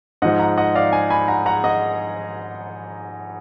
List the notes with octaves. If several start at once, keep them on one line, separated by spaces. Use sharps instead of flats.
G#2 F3 D#5 F#5
F#5 A#5
D#5 F#5
D5 F5
F5 G#5
G#5 B5
F#5 A#5
F#5 A#5
D#5 F#5